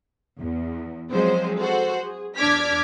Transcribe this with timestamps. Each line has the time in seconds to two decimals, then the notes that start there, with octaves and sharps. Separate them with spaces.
0.40 E2
1.11 F3 F#3 G#3 C4 C5
1.59 F#4 A4 C5
2.04 G#4
2.36 E2 D4 D6 F6 G#6 B6